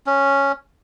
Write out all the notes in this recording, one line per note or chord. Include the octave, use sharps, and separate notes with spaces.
C#4